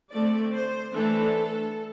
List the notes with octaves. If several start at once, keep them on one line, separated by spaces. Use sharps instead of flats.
D3 A3 C4 D5
C5
E3 A3 D4 A4